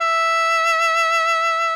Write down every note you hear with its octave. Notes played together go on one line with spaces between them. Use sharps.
E5